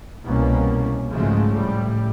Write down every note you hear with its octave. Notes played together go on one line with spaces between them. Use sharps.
C2 B2 A#3 C#4
G#2 C#3 F3 F#3 G#3 A3
A2 G3